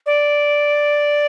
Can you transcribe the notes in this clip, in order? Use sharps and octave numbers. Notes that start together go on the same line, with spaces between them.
D5